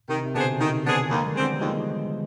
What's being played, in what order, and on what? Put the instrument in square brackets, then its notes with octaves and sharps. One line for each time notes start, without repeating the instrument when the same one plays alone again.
[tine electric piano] C3 [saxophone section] D#3
[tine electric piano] C3
[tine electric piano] B2 D3 [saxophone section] B3 D4 G#4 C5
[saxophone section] D#3
[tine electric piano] C3 D#3 [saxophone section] B3 D4 G#4 C5
[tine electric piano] D#3
[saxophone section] D#2 [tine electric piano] D3 F3
[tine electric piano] G#3
D#3 G3
[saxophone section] D3 G#3 C4
[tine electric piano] G3 B3
[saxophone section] D#2 [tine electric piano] F3 G#3